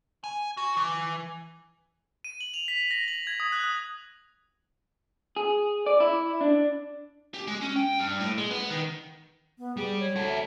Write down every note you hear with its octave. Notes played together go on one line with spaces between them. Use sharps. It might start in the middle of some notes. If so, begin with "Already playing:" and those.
G#5
F#4
E3
D#7
F#7
F7
B6
A#6
F#7
G#6
D#6
F#6
D#6
G#4
D5
E4
D4
G4
G#3
C#4
G5
G2
A2
G#3
B3
D#3
B3
G3 G#4
C#5
F#4 A4
E5